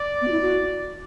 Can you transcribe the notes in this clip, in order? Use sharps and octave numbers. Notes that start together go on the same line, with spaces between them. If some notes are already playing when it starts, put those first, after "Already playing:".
Already playing: D5
B3
F#4
E4
F#4